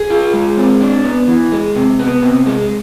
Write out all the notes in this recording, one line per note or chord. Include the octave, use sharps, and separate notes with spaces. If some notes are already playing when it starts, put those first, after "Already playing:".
Already playing: G#4
F4
G#3
C4
D4
B3
E3
G#3
C3
B3
C3
G#3